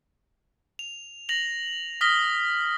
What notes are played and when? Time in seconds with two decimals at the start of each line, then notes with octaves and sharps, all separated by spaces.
0.79 F7
1.29 A#6 F7 F#7
2.01 D#6 F6 A#6 B6 G7